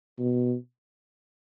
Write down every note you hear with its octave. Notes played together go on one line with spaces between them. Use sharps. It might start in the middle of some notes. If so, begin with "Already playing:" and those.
B2